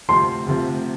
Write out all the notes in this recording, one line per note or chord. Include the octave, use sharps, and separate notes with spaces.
D2 C3 F3 C4 C6
D2 C3 F3 C4